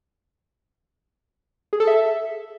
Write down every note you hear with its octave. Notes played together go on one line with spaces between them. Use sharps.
G#4
A4
E5